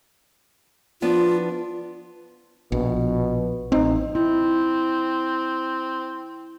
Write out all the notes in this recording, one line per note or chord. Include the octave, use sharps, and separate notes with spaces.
F3 B3 D4 F4
A#1 B2
A1 C4 D#4
C4 E4